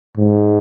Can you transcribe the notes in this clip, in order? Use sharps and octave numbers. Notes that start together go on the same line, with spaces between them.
G#2